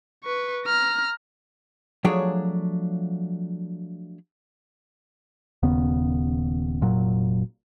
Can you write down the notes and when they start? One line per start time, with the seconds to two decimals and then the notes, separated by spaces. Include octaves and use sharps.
0.24 B4 C#6
0.66 A#5 F6
2.04 F3 F#3 A3 D4 G#4 C#5
5.63 D#1 D#2 C#3 B3
6.81 F1 A#2 F#3